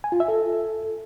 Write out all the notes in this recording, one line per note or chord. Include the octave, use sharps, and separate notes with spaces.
G#5
F4
E5
A4